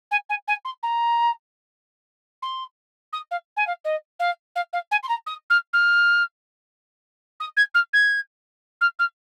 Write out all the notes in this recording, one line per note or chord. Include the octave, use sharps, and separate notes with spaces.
G#5
G#5
G#5
C6
A#5
C6
D#6
F5
G#5
F5
D#5
F5
F5
F5
G#5
C6
A#5
D#6
F6
F6
D#6
G#6
F6
G#6
F6
F6